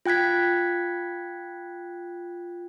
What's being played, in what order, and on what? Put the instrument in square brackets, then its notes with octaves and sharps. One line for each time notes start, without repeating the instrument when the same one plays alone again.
[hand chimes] F4 G5 F#6 G#6 B6